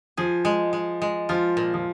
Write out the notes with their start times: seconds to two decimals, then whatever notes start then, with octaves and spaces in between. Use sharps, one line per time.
0.17 F3 G#4
0.45 G#3
0.73 G#3
1.02 G#3
1.29 F3 F4
1.57 A#2
1.74 F3